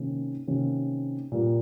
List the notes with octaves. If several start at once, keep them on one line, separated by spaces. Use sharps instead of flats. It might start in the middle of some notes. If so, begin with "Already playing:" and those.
Already playing: C3 D#3 A#3 C#4
C3 D#3 A#3 C#4
A#2 G3 A#3